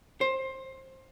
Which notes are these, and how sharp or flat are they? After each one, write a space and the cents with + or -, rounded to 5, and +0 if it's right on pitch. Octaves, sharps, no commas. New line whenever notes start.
C5 +20